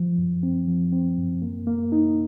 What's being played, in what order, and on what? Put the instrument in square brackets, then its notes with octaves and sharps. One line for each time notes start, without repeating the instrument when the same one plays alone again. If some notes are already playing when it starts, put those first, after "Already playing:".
Already playing: [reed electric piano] F3
F#2
C4
F3
C4
F#2
A#3
A#3
D#4